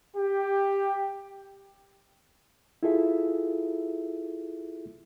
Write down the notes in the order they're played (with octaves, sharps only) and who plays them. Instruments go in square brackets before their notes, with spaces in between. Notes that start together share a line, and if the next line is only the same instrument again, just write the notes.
[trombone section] G4
[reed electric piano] E4 F4 G#4 A4 E5